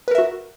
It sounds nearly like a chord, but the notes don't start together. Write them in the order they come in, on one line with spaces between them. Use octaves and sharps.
B4 A#4 E5 F#4